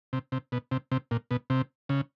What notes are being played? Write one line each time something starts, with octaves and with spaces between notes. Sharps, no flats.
C3
C3
B2
C3
C3
A#2
B2
C3
C#3